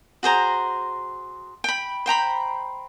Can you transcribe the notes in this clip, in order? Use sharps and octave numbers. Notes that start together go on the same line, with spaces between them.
F#4 G#4 C5 A#5
G5 B5
C5 G5 A#5 B5